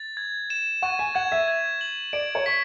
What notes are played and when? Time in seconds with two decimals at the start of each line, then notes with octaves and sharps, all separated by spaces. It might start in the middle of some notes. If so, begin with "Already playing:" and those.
Already playing: A6
0.17 G#6
0.50 E7
0.82 F#5 C#6
0.99 G#5
1.15 F#5 G#6
1.32 E5
1.48 G#6
1.81 F#7
2.13 D5 D7
2.35 C#5
2.46 C#6 B6